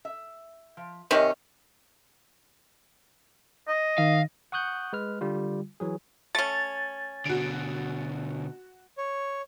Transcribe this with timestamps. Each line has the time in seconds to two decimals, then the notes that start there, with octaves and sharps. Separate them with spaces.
0.05 E5
0.77 F3
1.11 C3 D#3 C#4 D5 D#5
3.68 D#5
3.98 D#3 F5
4.52 F#5 C#6 D#6 F#6 G6
4.93 G#3 B4 F6
5.21 D3 G3 F4
5.80 E3 F#3 G#4
6.35 A3 C#4 A6
7.26 B2 D3 F#4 D7
8.98 C#5